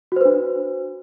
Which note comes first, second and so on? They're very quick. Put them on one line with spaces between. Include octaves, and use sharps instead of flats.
F#4 C5 B4 D4